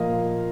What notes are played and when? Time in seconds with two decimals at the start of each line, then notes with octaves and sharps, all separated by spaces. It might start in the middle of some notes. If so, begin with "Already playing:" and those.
Already playing: A#2 F3 A#3 D#5 F5